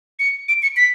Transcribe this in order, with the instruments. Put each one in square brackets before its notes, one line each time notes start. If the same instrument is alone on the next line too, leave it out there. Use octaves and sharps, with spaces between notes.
[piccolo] C#7
D7
C#7
B6